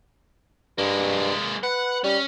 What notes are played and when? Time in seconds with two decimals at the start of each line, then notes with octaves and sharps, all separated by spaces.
0.78 G2 G#3 A#3
1.63 B4 F#5
2.04 G3 C#4